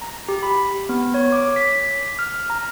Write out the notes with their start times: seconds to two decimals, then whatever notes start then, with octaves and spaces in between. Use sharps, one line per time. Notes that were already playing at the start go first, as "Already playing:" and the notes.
0.01 A#5
0.29 G4
0.43 B5
0.89 B3
1.14 C#5
1.32 D6
1.56 B6
2.19 F6
2.50 A#5